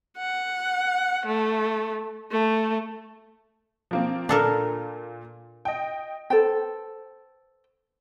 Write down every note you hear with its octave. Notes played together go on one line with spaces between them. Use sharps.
F#5
A3
A3
F3 A#3 C4
A#2 D4 A4 A#4
D#5 G5
A4 B4 C5 G5